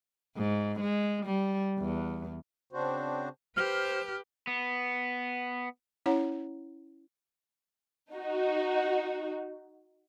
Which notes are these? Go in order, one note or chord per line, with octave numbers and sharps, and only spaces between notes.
G#2
G#3
G3
E2
C#3 C4 D4 F#4 C5
G4 B4 C5 F6
B3
C#4 E4 C#5 F#5 A#5
D#4 F#4